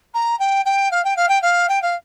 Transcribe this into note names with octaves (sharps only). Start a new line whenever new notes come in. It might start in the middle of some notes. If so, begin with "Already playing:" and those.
A#5
G5
G5
F5
G5
F5
G5
F5
G5
F5